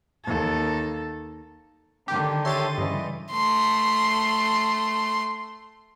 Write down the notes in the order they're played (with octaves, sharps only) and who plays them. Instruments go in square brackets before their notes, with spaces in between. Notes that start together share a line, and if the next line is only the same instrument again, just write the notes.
[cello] D#2 A4
[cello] D3 D#3 [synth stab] G4
[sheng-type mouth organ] G4 C#5 E5 [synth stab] C6 A6 D#7
[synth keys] G2 C#3 [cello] E3 G3 [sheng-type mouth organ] D#5
[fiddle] A3 C6